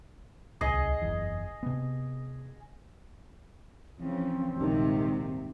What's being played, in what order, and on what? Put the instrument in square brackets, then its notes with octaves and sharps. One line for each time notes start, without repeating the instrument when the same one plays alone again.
[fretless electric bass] D1 C2 [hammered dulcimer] G#4 D#5
[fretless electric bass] F#1 E2
C3 B3
[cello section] C#3 E3 F3 [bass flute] C4
[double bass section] A#1 D#3 G3 [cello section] D#2 G#2 C3